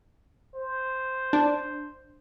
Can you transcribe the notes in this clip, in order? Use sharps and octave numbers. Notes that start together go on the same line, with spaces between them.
C5
D4